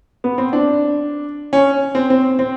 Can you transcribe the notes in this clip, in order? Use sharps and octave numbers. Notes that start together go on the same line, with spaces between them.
B3
C4
D4
C#4
C4
C4
C4